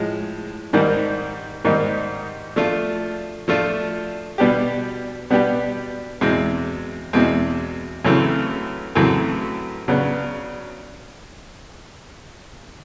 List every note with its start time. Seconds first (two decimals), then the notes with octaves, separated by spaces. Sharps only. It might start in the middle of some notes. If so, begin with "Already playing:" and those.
Already playing: A2 F3 G#3
0.73 G#2 D#3 G3 A#3 D#4
1.65 G#2 D#3 G3 A#3 D#4
2.56 F3 A3 D4 F4
3.48 F3 A3 D4 F4
4.38 B2 G3 B3 D4 G4
5.30 B2 G3 B3 D4 G4
6.21 E2 B2 G#3 C4
7.13 E2 B2 G#3 C4
8.05 F#2 C#3 E3 A3 C4
8.95 F#2 C#3 E3 A3 C4
9.88 C#3 F#3 B3 D4